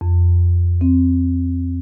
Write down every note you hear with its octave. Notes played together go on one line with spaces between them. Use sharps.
F2
C4